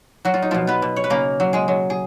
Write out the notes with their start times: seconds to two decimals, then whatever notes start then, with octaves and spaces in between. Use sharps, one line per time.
0.25 F#3 F#4
0.34 F4
0.42 D#4
0.51 B2 F3 F4
0.67 B3 B4
0.82 B2
0.96 C#5
1.04 B4
1.10 C#3 A#3 A#4
1.40 F#3
1.53 G#3 G#4
1.68 F#3
1.90 G#4